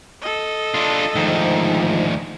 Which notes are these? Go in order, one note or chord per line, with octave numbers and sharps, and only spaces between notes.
A4 D#5
D4 F4
D2 G#2 D#3 F3